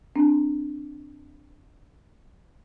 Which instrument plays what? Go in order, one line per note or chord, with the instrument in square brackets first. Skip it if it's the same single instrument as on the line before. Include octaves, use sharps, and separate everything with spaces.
[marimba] C4 D4